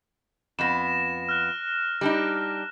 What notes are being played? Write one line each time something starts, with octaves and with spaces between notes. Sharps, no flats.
F2 B3 A#6 E7
F6 F#6
G3 D4 D#4